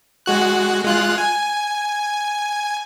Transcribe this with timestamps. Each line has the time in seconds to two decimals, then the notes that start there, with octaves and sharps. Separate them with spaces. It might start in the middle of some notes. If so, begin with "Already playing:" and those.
0.26 G#3 F#4 F#6
0.85 G#3 F4 F#6
1.18 G#5